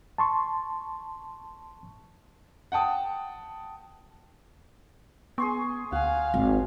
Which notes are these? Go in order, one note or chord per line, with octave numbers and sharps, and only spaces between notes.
A5 C6 C#6
F#5 G5 A5 D#6
B3 G#4 C6 C#6
D2 F5 F#5 G#5
G#1